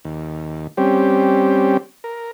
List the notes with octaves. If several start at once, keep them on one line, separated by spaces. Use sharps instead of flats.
D#2
G3 C4 C#4 G4
A#4